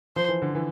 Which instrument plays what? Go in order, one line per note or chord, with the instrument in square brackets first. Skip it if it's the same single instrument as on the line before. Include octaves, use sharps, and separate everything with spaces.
[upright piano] F3 [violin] C5
[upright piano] E3
D3
E3